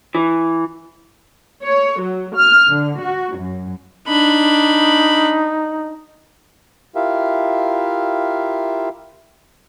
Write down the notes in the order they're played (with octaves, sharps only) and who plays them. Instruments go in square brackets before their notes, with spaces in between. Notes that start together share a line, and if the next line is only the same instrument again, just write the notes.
[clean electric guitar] E3
[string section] C#5
F#3
F6
D3
F#4
F#2
[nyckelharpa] D4 B5 [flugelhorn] D#4
[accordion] E4 F4 G4 A#4 E5 F5